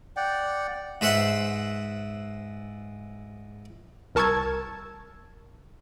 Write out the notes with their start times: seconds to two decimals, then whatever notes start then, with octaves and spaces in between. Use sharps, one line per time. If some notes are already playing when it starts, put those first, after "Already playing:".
0.17 D5 F#5 G5
1.01 G#2 B4 C5 E5 F#5 C6
4.15 C2 A#4 A5 C#6 E6 G#6